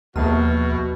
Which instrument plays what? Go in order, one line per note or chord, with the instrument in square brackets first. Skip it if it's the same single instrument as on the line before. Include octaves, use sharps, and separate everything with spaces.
[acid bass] D#2 [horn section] B2 F#4 [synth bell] F3 A#3 F6